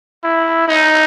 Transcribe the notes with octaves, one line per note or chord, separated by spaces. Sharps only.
E4
D#4